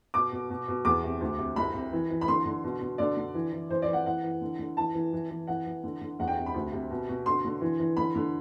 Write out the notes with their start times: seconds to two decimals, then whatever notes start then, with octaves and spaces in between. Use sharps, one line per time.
0.14 B2 D6
0.32 B2
0.50 B2
0.68 B2
0.85 E2 D6
1.04 C3
1.21 D2
1.38 C3
1.56 C2 B5
1.74 C3
1.92 E3
2.10 E3
2.21 B5
2.28 D3 C6
2.45 D3
2.64 B2
2.81 B2
2.98 D3 D5
3.16 D3
3.34 E3
3.52 E3
3.69 E3 C5
3.82 D5
3.87 E3
3.93 F#5
4.06 E3 F#5
4.23 E3
4.41 D3
4.58 D3
4.77 E3 A5
4.94 E3
5.13 E3
5.30 E3
5.47 E3 F#5
5.66 E3
5.83 D3
6.01 D3
6.19 E2 F#5
6.28 G5
6.37 C3
6.46 B5
6.54 D2
6.72 C3
6.90 B2
7.08 B2
7.26 D3 C6
7.44 D3
7.61 E3
7.79 E3
7.97 D3 B5
8.15 D3